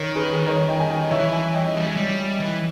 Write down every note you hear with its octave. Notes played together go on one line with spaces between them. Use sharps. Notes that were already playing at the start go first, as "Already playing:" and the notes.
Already playing: D#3 A#4 C#5
G#4 B4
A#4 C#5
D#5 G5
G#5
D#5 G5
E3 C#5 E5
E5 G#5
D#5 G5
G3
G#3
G3
E3